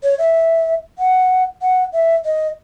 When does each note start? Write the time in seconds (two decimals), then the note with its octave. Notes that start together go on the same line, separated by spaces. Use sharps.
0.03 C#5
0.19 E5
0.99 F#5
1.62 F#5
1.93 E5
2.25 D#5